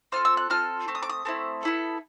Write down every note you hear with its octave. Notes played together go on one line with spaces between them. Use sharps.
C4 F4 A4 F6
E6
F#6
C4 F4 A4 F6
A3 C4
D#6
D6
D#6
A3 C4 E4
B3 E4 A4